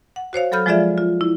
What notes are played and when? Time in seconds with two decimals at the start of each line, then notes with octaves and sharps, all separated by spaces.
0.16 F#5
0.33 F#4 C5 C#5 F5
0.52 F#3 A4 B5 F6 G6
0.66 F3 G#3 F4 G#4 D5 E5
0.98 F4
1.21 E4